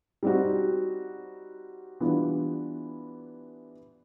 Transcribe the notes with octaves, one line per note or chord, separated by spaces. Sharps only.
G3 C4 D#4 F#4
E3 G3 B3 D4 F4